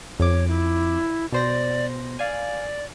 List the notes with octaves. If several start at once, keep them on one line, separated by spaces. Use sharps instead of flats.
F2 C#5 D6
E4
B2 C5 D5 A#6
D5 F5 G#5